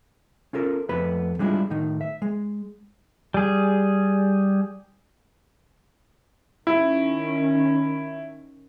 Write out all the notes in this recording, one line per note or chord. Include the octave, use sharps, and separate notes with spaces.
C#4 F4 A4 A#4
F2 A3 B3 B4 B5
G3 G#3 D4 E4 F4
A2 D#3 D#4
E5
G#3
G3 G#4
D#3 C#4 E4